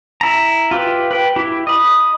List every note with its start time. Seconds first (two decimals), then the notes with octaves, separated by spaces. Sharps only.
0.21 E4 A#5
0.71 F4 G4 B4
1.11 B4 G5
1.36 E4 G4
1.67 D#5 B5